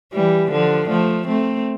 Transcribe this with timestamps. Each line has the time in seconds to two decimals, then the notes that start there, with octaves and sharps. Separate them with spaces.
0.13 E3 G3
0.50 D3 F3
0.88 F3 A3
1.27 A3 C4